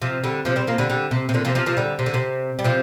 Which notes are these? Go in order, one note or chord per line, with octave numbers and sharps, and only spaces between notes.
C3 F3
D3 G3
C3 F3
G3 C4
F3 A#3
D3 G3
D3 G3
C3
C3
A#2 D3
C3 F3
C3 F3
C3 F3
D3 G3
C3
D3
C3
G3
C3 F3